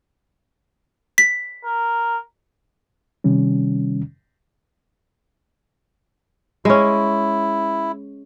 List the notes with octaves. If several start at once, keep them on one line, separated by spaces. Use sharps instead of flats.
B6
A#4
C3 D#3 G3 C#4
G#3 C#4 E4